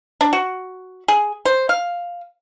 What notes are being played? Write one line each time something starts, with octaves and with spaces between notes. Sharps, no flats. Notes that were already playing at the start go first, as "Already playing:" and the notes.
D4
F#4
G#4
C5
F5